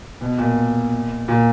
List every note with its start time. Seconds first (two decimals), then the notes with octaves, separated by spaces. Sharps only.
0.21 B2
0.38 A#2
1.28 A#2